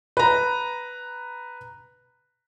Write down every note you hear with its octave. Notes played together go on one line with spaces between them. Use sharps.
B4 A#5